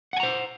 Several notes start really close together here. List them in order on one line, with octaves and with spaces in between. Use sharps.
F#5 G#5 A#5 C5